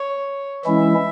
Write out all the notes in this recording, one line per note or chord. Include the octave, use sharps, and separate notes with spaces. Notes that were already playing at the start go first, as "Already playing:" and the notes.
Already playing: C#5
E3 G#3 C#4 E4 E5